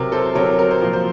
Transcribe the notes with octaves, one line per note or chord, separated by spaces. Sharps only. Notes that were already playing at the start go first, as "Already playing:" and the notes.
Already playing: C3 F#3 A#4
A4 C5
C3 F#3 A#4 C#5
A#4
C5
A#2 F3 A#4
C5